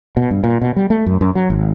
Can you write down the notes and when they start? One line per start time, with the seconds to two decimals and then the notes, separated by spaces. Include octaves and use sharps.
0.17 B2
0.31 G2
0.44 A#2
0.62 B2
0.76 G3
0.90 A3
1.06 F#2
1.21 F#2
1.35 F#3
1.50 G#1